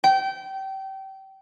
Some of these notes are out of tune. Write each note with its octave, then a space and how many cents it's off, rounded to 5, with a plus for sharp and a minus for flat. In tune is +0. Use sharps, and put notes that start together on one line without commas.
G5 -25